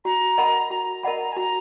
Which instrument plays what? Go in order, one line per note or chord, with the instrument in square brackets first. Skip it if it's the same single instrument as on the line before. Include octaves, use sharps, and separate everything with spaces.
[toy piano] F#4 [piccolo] A#5
[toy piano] A#4 D#5 F#5 B5
[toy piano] F#4 [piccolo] A#5
[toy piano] A#4 D#5 F#5 B5
[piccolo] G#5
[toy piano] F#4 [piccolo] A#5